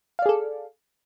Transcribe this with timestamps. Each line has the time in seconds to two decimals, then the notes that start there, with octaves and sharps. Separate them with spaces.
0.19 F5
0.22 D5
0.26 G#4
0.29 A4